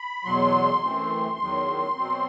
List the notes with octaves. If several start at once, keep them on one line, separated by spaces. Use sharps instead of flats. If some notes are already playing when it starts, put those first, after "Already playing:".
Already playing: B5
E2 B2 F#3 C6
F#2 E3 A3 C4
E2 D#3 F#3
B2 F#3 C4